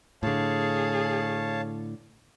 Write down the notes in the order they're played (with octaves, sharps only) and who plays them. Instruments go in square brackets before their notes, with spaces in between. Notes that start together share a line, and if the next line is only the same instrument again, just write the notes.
[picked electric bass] A2 D3 [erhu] G#4 [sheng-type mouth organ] C#5 F5 A5